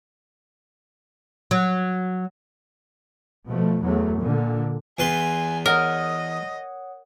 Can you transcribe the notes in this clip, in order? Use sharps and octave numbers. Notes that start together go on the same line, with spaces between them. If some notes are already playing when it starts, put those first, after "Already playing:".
F#3
B2 F3 A3
E2 F#3 A3
A#2 D3
E2 B4 G#5 C6
A#4 C#5 D#5 F#5 D#6